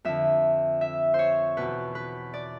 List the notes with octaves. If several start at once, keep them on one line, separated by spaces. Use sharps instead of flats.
F2 D3 E5
E5
C5
C#5
E2 B2 B4
B4
D5